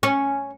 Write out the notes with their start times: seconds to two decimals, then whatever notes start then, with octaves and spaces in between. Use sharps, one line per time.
0.03 C#4